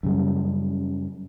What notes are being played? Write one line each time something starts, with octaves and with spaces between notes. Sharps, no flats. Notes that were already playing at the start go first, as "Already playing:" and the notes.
F#2 C#3 G3